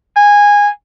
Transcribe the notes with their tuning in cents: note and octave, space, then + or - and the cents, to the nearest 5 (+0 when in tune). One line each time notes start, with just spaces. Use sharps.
G#5 -15